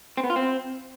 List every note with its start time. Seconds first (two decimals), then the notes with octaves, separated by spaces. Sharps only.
0.17 C4
0.24 B3
0.30 F4
0.36 C4